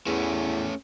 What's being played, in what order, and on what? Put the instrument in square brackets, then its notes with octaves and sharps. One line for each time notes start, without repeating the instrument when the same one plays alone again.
[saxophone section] E2 [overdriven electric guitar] A3 C#4